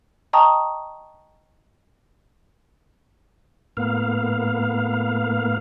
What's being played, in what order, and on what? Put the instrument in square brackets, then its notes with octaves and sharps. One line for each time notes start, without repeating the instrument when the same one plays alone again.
[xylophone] D#5 G5 A5 A#5 C#6 D#6
[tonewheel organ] A2 A#3 B3 F5